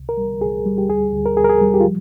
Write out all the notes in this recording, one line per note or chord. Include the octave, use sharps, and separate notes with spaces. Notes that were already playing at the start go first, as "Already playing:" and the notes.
Already playing: C2
A#4
G3
C2 G#4
G3
G4
D2 G#4
D2
A#4
D2 G#4
A#4
G#4
G3
G4
F4
F3